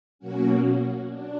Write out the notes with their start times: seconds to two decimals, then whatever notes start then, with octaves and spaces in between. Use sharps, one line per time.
0.19 B2 F#3 A#3 C#4 F#4
1.09 D4